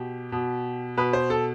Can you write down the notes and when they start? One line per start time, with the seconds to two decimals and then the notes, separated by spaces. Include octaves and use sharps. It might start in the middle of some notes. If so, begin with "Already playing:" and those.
Already playing: B2 G4
0.32 B2
0.97 B2 B4
1.13 C5
1.30 A4